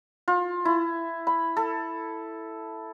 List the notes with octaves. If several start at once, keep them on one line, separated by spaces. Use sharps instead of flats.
F4
E4
B5
A4